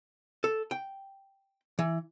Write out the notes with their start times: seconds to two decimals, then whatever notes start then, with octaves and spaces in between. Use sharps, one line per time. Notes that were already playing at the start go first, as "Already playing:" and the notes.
0.44 A4
0.71 G5
1.79 E3